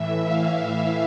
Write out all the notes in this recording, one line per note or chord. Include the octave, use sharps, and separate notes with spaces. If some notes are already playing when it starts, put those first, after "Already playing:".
Already playing: A2 E3 E5
F5
E5